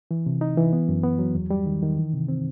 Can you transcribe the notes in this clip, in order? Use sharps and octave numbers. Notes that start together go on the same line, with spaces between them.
E3
C3
D#4
E3
B3
F#2
B3
F#3
E2
G3
D#3
D#3
E3
C3
C4